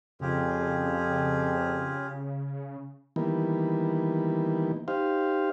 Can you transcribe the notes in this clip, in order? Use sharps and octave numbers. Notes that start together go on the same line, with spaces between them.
F2 C#3 F4 G4 G#4
D#3 E3 G3 A#3 B3
D#4 G4 C5 F5